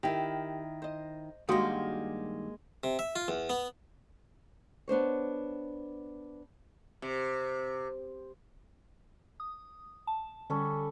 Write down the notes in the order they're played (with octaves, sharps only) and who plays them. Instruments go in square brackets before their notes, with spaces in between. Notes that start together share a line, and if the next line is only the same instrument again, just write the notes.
[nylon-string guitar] D#3 E4 [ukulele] G4 A#4
[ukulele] C5 D#5
[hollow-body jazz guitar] G2 D#3 G3 [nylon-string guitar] G#3 A#3 [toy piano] F#4 D#6 [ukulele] F#5
[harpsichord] C3
E5
F4
E2
B3
[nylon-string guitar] B3 D4 C5 C#5
[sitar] C3
[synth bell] D#6
A5
[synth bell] D3 [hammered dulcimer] G3 C#4 A4